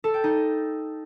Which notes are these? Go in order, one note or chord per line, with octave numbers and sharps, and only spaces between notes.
A4
G5
D#4